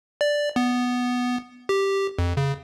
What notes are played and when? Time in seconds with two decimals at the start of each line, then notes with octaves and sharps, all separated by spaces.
0.21 D5
0.56 B3
1.69 G4
2.19 F2
2.37 C#3